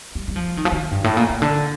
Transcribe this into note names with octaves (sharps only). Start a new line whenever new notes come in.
G3
G3
F3
D#3
F3
D#3
G2
A2
A#2
C3
D3